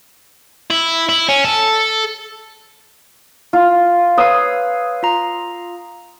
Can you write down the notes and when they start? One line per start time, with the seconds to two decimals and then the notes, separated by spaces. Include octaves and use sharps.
0.70 E4
1.09 E4
1.29 C#4
1.45 A4
3.53 F4
4.18 B4 C#5 F5 D#6 E6
5.03 F4 F5 A#5